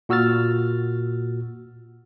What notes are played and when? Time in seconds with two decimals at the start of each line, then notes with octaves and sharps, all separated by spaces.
0.09 A#2 F#4 E6 F6 A6